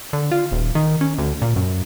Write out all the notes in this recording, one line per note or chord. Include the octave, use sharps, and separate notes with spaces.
D3
F4
D#1
D#3
C#4
D2
A#2
F#2